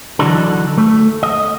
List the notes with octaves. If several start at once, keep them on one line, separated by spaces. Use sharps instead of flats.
D3 E3 F#3 D4 D#4 A4
A3
D#5